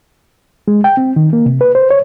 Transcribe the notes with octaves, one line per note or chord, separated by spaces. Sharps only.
G#3
G5
C4
D#3
A#3
C3
B4
C5
C#5